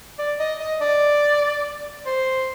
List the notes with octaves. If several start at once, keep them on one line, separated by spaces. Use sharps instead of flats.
D5
D#5
D#5
D5
C5